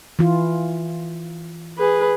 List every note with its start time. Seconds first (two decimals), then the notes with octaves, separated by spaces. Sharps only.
0.19 E3 F4
1.78 G#4 B4